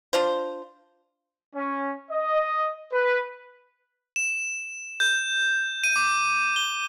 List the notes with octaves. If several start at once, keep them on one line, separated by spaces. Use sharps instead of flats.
D4 F4 C5
C#4
D#5
B4
E7
G6
D#7
D6
G7